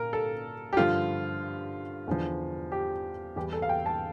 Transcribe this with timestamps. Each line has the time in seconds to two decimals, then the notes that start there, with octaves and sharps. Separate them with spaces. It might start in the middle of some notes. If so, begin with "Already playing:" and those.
Already playing: A#2 A#4
0.13 A4
0.73 G4
0.77 G2 D3 F3 F4
2.08 E2 D3 F3
2.72 G4
3.36 E2 E3 G3 G4
3.52 A4
3.62 F5
3.69 G5
3.86 A5